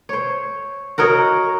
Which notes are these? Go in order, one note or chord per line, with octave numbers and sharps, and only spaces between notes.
C5 C#5
F#4 A#4 C#5 D#5